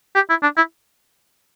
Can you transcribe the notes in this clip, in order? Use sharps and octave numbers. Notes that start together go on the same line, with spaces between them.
G4
E4
D4
E4